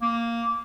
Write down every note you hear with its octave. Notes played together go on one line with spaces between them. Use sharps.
A#3